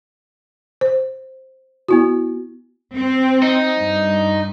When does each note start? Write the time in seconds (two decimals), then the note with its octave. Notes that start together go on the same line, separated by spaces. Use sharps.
0.81 C5
1.88 B3 E4 F#4
2.96 C4
3.43 D#4
3.80 G2